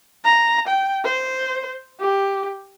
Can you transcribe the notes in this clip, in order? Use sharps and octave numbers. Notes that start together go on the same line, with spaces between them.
A#5
G5
C5
G4